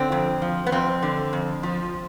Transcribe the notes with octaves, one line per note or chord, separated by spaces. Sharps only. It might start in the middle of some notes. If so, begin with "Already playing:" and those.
Already playing: D3 C4
F2
F3
B3
F2 C4
D3
F2
F3